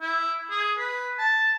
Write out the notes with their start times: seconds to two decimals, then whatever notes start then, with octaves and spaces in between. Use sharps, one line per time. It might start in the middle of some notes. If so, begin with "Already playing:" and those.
0.01 E4
0.50 G#4
0.78 B4
1.19 A5